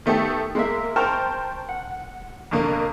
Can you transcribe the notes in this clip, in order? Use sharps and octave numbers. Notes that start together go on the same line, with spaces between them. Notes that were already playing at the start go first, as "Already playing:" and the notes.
D#3 A3 B3 G4 A4
G#3 A#3 E5
A#4 C5 G5 A5 C#6 F6
F#5
F2 B2 D3 A#3